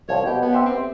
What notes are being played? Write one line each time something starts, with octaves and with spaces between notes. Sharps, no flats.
C2 F3 C#5
B2 G4
B3
G4 C5 E5
C4